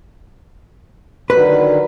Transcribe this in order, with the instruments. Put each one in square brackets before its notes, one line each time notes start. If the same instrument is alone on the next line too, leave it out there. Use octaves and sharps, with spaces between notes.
[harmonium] D3 D#3 F#3 [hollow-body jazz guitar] B4